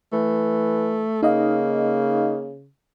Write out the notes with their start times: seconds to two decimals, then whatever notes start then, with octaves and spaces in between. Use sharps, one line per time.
0.13 E3 A3
1.22 C#3 A#3 D#4 D#5 F5